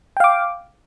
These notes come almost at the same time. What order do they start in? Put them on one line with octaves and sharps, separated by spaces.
G5 F5 D6